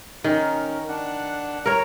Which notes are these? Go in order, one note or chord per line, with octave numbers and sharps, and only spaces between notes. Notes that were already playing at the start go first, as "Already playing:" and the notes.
D#3 C#4 A#4
D4 F#5
A#4 C#5